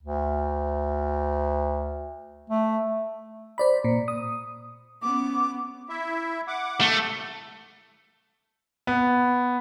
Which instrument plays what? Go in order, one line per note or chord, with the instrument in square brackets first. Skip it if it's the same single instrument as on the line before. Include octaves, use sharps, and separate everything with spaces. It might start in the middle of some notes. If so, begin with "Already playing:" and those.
[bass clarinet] D2
A3
[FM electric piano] C5 D5 B5
A#2
D#6
[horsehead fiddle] B3 C#4 [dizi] D6
[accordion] E4 E5
F#5 D6
[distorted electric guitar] A3
[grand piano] B3